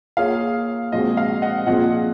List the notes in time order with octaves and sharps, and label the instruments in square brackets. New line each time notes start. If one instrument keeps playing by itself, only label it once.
[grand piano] A#3 F4 G#4 C#5 [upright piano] F5
[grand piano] A#2 F3 G#3 C4 F#4 [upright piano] D#5
[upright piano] F5
D#5 F#5
[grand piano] A#2 F3 C4 F4 G#4 [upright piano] D#5 F#5